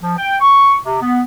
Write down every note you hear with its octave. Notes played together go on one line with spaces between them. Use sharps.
F3
G5
C#6
C3
B3